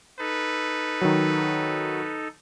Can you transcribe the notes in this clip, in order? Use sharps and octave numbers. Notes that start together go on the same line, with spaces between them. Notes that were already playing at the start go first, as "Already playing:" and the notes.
D#4 A4 B4
D#3 F#3